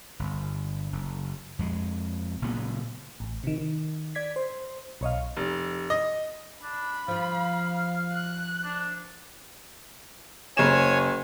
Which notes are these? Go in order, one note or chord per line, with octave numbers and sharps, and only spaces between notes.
G1
F#1
F2 G#3
F#1 A#2 C#3 B3
A1
C3 D#3
D#3
D5 G#6 B6
C5
B1 C#5 D#5 F5
F1
D#5
D4 B5
F3 F4 F5
F#6
D4
F#1 C#5 G#5 E7